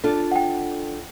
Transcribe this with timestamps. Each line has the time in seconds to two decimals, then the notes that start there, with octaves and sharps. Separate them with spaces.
0.04 D4 F4 A4
0.31 F#5 G5